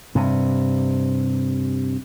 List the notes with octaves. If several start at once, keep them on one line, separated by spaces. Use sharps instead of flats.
G2 C3